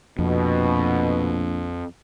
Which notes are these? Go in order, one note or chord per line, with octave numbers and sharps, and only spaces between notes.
A#1 F2 B2